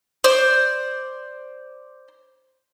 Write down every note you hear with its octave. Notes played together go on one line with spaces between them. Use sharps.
C5 D5